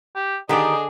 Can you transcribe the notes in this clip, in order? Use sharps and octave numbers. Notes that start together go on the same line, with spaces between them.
G4
D3 D#3 D4 G4 G#4 D5 D#5